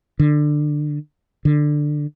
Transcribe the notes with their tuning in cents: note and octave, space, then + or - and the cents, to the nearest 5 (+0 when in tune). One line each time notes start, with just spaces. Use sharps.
D3 +20
D3 +15